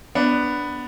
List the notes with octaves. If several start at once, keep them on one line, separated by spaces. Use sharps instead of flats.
B3 D4